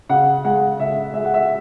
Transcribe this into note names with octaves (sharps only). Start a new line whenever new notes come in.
C#3 F#5
G#3 F#5
C#3 E5
G#3 E5
F#5
E5